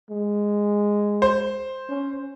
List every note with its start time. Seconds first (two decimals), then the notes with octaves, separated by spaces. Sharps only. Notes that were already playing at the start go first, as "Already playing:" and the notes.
0.10 G#3
1.22 C5
1.89 C#4